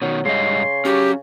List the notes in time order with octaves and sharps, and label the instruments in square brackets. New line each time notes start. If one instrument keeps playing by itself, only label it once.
[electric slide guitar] B2 D#3 [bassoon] F#3
[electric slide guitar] G#2 G3 D#5 [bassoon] C#3 [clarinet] C6
[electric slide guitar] C#4 F#4 [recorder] G4